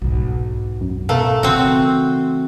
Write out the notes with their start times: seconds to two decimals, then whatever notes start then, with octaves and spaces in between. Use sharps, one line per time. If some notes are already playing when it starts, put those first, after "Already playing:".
0.02 B1 G#2
0.81 F#2
1.09 B2 A3 A#4 F5
1.43 C#3 E3 C4 F#4